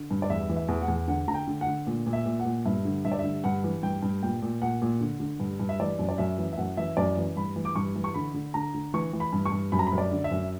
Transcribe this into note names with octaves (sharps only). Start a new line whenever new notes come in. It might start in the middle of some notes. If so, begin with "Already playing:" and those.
Already playing: D3
G2
D5
E2 E5
E3
E5
E2
F#5
E2
D3 F#5
D3 A#5
G5
D3
F#5
D3
A#2
A#2
E5
A#2
F#5
A#2
G2 E5
D3
G2 E5
D5
D3 E5
G2 F#5
E3
G2 G5
G2
A#2 G5
A#2
A#2 F#5
A#2
D3
D3
G2
G2
E5
E3 D5
F#2
D5
F#2 E5
E3
E5
F#2 F#5
E3 E5
F#2 D5
E3
G2 B5
E3
D6
G2 C#6
E3
C#6
D3 B5
D3
D3 A#5
D3
E3 C#6
E3
B5
G2
C#6
G2
F#2 B5
A#5
B5
F#2
D5
D3
E5
F#2